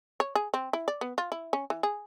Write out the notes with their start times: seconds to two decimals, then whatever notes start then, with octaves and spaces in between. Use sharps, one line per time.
0.20 C#5
0.35 G#4
0.54 C4
0.73 E4
0.88 D5
1.01 B3
1.18 F4
1.32 E4
1.53 C#4
1.70 E3
1.83 G#4